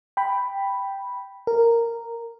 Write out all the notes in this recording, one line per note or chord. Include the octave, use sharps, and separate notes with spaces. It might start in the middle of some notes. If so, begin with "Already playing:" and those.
G5 B5
A#4